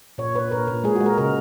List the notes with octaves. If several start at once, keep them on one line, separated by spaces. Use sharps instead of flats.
A#2 C#5
A#2 B4
A#2 A#4
A#2
G#3 G#4
G#3 F#4
A#4
C#3 A#4